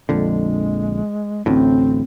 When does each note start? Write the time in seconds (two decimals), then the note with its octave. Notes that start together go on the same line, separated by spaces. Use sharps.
0.09 A#1 F2 D3 G#3
1.46 A1 D2 A2 C4